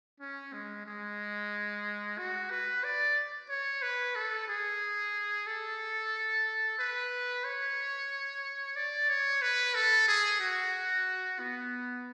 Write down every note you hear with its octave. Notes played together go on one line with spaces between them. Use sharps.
C#4
G#3
G#3
F#4
B4
D5
C#5
B4
A4
G#4
A4
B4
C#5
D5
C#5
B4
A4
G#4
F#4
B3